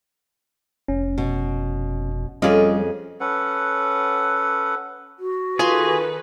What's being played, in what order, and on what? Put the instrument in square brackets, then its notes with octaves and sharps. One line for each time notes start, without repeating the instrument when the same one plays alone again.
[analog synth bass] F1 [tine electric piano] C#4
[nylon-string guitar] B2
[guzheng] F2 G#4 B5 [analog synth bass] G3 [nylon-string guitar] C#4 F4 D5 [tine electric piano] D#5
[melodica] C#4 A4 B4 F#5
[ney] F#4
[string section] D#3 A4 B4 [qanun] F4 F5 C6 [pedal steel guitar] G#4